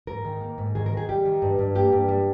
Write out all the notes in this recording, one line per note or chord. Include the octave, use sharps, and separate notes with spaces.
G#2 A#4
D#3
A#3
G#2
D#3 G#4
A#4
D#3
G#4
G3 G4
D#3
G2
G2
A#3 G4
G2
G3